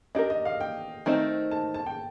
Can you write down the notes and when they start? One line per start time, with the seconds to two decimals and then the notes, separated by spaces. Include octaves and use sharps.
0.15 D4 G4 A#4 D#5
0.30 D#5
0.45 F5
0.60 G5
1.06 D#3 A3 C4 D#4
1.51 A5
1.74 A5
1.86 G5